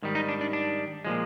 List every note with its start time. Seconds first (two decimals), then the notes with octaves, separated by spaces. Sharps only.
0.02 G#2 D#3 G3
0.15 D#4
0.29 D4
0.41 D4
0.53 D4
1.05 A#2 F3 G#3